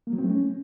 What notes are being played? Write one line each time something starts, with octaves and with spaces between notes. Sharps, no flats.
A#3
F#3
C4
A3
C#4